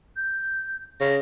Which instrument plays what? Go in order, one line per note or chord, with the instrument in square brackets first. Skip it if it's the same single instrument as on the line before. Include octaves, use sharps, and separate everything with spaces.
[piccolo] G6
[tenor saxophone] C#3 [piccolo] A#6